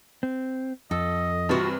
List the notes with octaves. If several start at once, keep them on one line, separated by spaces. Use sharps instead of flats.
C4
F2 A4 D#5
G2 C3 E3 F4 F#4